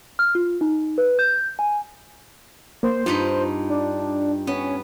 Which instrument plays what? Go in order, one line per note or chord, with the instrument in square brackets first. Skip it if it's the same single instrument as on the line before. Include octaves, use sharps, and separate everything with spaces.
[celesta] F6
F4
D#4
B4
G6
G#5
[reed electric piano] A#3 [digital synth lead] C5
[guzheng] G2 D#4 B5 [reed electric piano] F4
[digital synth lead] D4
[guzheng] B3 [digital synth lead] C#4